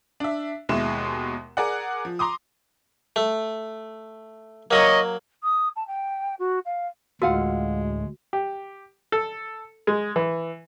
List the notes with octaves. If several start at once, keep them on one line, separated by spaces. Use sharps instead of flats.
D4 E5
D#2 B2 G#3 E4 E7
G#4 A#4 D5 F#5
F3
A#5 C6 D6 D#6
A3
F#3 A#3 C#5 D#5
D#6
A5
G5
F#4
F5
D2 A2 G#3 F4 F#4 A#4 F5 F#5
G4
A4
G#3
E3